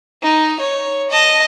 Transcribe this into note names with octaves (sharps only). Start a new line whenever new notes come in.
D#4
C#5
D#5 A5